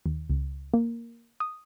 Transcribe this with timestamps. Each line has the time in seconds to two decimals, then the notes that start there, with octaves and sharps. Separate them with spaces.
0.06 D#2
0.30 C#2
0.74 A#3
1.40 D#6